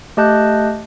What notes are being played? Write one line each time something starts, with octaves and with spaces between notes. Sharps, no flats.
A3 G4 D#5 A5 F#6 G6